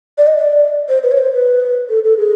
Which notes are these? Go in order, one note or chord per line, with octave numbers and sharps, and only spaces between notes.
D5
D#5
D5
C5
B4
C#5
C5
B4
A4
A4
G#4